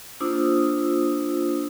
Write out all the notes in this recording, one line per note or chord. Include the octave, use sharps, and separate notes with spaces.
A#3 D4 F4 C5 D#6 E6